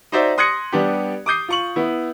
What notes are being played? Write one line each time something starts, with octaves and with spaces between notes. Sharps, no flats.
D#4 F#4 C5 D5 E5
C6 D#6 F#6 G#6 A#6 C#7
G3 B3 D4 G4
D6 D#6 G6 C7
F4 C#6 F#7
B3 E4